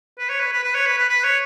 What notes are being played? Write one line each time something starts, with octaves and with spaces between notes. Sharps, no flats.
B4
C#5
B4
B4
B4
C#5
B4
B4
B4
C#5